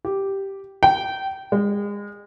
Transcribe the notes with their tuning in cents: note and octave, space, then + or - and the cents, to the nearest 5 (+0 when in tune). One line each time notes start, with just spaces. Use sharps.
G4 -5
G5 -20
G#3 -30